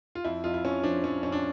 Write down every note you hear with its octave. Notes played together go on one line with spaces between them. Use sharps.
F4
F2 E4
F2 F4
E4
F2 C#4
F3 D4
F3 C#4
F2 C#4
D4